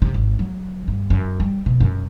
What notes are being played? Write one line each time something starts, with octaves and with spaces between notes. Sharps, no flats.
C3
G#1
F#3
G2
F#2
G3
B2
F#2